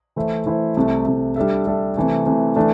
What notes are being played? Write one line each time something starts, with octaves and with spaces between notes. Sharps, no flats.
E3 A3 E4 C5 E5
E3 A3 E4 C5 E5
C2 C3 A3
C2 C3 A3
G3 D4 A4 E5
G3 D4 A4 E5
C3 E3 A3
C3 E3 A3
E3 A3 D4